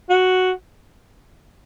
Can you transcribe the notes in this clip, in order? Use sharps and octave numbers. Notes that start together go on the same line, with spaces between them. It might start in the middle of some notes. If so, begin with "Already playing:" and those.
F#4